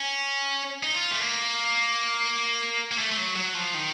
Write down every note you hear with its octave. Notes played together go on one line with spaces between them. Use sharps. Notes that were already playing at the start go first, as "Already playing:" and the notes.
Already playing: C#4
D#4
F4
A3
A#3
A#3
A3
A3
F#3
F#3
F3
D#3